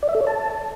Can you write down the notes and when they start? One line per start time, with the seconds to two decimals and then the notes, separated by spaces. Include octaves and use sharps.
0.03 D5
0.09 E5
0.15 A4
0.21 C#5
0.27 A5